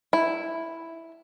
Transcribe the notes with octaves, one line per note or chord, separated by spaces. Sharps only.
E4